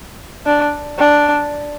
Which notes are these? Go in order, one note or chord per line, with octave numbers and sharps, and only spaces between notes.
D4
D4